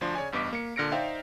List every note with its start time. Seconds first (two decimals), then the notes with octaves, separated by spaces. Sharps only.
0.01 D2 F3 D4 C6
0.15 C#3 C#5 D5 G#5
0.32 A1 G2 B3 D#5 D6 B6
0.53 A#3 C#7
0.76 A#2 D3 F6 A#6 C#7 D7
0.92 D#4 C5 D5 E5 F5 G5